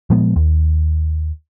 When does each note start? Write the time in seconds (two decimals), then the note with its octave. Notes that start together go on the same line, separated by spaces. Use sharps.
0.10 A#2 F3 G#3 B3
0.36 D#2